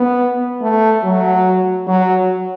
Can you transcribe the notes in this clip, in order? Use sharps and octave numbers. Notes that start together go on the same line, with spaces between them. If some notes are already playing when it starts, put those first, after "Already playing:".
Already playing: B3
A3
F#3
F#3